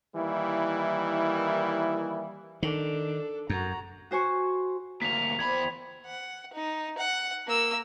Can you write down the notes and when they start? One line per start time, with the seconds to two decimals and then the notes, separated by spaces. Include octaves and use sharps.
0.15 D#3 E3 G3 A#3 E4
2.63 D#3 D4 A4
3.50 F#2 F#4 A#5
4.11 F#4 C5 G#5 C#6
5.02 D2 A#3 B6 F7
5.39 E2 G4 C5 D5 B5 G#6
6.06 F#5
6.53 D#4
6.98 F#5
7.47 A#3 E6